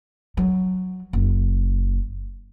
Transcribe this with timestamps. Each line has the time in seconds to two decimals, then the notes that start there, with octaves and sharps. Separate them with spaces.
0.37 F#3
1.13 F#1